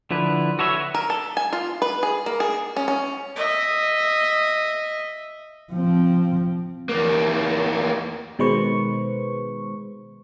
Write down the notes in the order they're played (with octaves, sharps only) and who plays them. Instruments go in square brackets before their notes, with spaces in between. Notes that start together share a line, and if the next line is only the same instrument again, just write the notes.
[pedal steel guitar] D3 F3 E4 B4
F#4 A4 B4 C#5 E5
[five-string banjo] A#4
A4
G#5
F4
B4
G#4
A#3
G#4
C#4
C#4
[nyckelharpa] D#5 E5
[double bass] F3 C4
[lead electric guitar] E2 A#3
[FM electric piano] B2 D#3 G#3 B4 C5 C#6